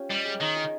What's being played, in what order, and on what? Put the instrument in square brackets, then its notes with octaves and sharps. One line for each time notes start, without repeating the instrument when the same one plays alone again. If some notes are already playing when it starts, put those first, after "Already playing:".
Already playing: [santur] C#4 F4 G4
[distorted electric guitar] G3 [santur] D#5
[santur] G#4
[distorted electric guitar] D#3 [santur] D#4
[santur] G#4